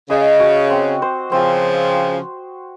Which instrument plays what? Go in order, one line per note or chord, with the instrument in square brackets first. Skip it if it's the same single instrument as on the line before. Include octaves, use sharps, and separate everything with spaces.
[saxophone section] C#3 [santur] D#5
[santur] F#4
C4
C5
[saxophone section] C#3 F3 [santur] C4